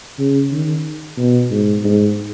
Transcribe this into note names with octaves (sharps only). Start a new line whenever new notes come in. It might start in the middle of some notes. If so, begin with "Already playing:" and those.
C#3
D#3
B2
G#2
G#2